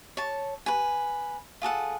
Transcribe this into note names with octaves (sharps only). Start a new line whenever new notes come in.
C#5 A5
B4 G#5
F4 G#4 A4 F#5